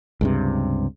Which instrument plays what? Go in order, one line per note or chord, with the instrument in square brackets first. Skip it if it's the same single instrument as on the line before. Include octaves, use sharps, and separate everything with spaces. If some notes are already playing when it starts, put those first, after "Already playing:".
[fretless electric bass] C#2 G2 C3